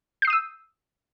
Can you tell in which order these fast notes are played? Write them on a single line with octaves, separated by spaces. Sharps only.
G6 C7 D#6 D#7 E6